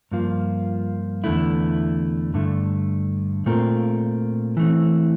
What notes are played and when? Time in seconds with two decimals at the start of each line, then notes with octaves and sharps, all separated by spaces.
0.11 G2 F3 A#3 F4
1.24 E2 D3 A3 E4
2.34 G2 D3 A3
3.46 A#2 A3 C4 F4 A#4
4.57 E3 A3 C4